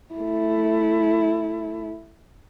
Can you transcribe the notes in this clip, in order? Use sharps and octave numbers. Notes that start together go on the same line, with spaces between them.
A3 E4